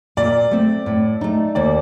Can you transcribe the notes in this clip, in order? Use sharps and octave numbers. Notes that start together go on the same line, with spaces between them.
A#2 D5
A3 C4
A2
A3 D#4
D#2 D5